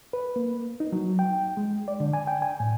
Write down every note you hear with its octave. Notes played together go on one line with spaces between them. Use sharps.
B4
A#3
D#4
F#3
G5
G#3
D5
D3
G#5
G5
G#5
A2